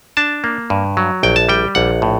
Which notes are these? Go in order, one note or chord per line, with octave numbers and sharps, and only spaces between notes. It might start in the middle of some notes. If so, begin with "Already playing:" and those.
D4 A5
A#3
G2
F#3
A#1 G5
A5
G3 G5
A#1 F#5
A2